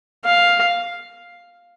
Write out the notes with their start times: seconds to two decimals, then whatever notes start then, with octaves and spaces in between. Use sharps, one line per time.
0.25 F5